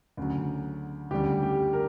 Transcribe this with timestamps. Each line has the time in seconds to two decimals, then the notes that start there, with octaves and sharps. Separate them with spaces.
0.17 D2 C#3 F#3
1.11 D2 C#3 G3 G4
1.43 G4
1.73 A#4